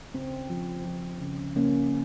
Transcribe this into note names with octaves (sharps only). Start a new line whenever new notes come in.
C#3 C4
F3
F3
C#3
C#3 A#3 C#4